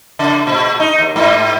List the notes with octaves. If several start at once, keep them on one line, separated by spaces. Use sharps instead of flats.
C#3
A#2
D#4
D#2
G#2